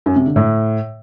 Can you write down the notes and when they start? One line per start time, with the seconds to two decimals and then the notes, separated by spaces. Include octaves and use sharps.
0.06 F#2
0.16 C3
0.26 D3
0.36 A2